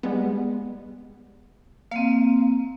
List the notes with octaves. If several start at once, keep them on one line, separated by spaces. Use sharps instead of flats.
G3 G#3 B3
A#3 C4 F5